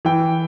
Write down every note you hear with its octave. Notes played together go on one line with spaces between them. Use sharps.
E3 G5